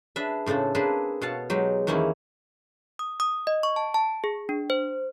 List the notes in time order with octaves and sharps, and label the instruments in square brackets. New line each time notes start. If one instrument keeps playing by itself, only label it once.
[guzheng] D4 G#4 B4 E5
A2 C#3 C4 D4 A4
A#3 C4 D4 G#4 A4 B4
B2 C#5 F5 F#5 A5
F#3 G#3 D#4 G4
E2 D#3 A#3 C#4 E4 C#5
[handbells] D#6
D#6
D#5
C#6
A5
A5
G#4
D4
C5